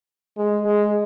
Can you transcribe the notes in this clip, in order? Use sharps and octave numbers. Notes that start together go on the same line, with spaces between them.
G#3
G#3